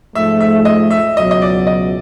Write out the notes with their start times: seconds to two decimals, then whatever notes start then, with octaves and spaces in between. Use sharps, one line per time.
0.15 G#2 F3 A3 E5
0.41 E5
0.65 D#5
0.91 E5
1.17 C#2 B2 F#3 D#5
1.31 D#5
1.42 D5
1.67 D#5